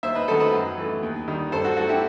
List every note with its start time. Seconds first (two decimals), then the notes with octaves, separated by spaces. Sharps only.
0.03 D#2 C5 E5
0.15 B4 D#5
0.28 D#3 F#3 A3 A4 C5
0.40 B4 D#5
0.53 F#2
0.77 E3 A3
1.03 D#2
1.28 D#3 G3
1.52 G2 A4 C5
1.64 F#4 A4
1.77 F#3 A3 F#4 A4
1.89 E4 G4